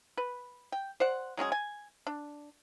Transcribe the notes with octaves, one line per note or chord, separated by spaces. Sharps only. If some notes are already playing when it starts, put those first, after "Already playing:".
B4
G5
C5 D5 F#5
F#3 G#3 C#4 G#4
G#5
D4